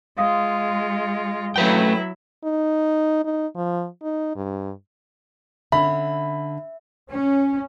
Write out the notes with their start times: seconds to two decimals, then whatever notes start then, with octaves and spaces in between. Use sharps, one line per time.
0.18 G#3 F4 F5 D#6
1.56 F#3 A3 E4 B4 G5
2.44 D#4
3.25 D#4
3.56 F3
4.03 D#4
4.36 G2
5.72 D3 C#4 E5 B5
7.10 C#4